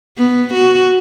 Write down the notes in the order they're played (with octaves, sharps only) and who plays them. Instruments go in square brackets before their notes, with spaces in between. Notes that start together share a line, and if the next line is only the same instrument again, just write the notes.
[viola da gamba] B3
F#4